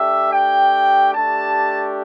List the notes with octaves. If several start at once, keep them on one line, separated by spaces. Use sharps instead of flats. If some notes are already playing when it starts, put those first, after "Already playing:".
Already playing: A3 D4 G4 E5
G5
A3 D4 G4 A5